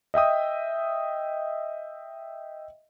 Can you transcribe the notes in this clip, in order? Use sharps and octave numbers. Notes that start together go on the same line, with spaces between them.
D#5 E5 G5 D#6